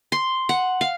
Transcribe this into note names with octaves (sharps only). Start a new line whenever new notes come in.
C6
F#5
F5